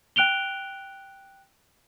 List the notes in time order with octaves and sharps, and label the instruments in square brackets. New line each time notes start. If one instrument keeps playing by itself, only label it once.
[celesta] G5 F#6 D7 F7 G7